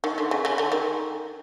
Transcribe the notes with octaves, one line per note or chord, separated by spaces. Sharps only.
D#3
D3
C#3
C#3
D3
D#3